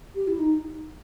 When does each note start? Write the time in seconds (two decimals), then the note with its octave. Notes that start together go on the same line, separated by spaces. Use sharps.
0.15 G4
0.27 E4
0.39 D#4